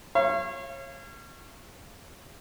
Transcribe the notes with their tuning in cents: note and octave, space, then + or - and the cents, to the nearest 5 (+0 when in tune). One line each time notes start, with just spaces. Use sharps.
C#5 -30 F5 -35